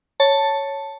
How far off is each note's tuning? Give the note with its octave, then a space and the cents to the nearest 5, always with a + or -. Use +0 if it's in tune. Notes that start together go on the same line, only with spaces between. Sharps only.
C#5 +0 A5 +5